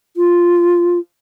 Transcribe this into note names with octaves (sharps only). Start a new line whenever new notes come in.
F4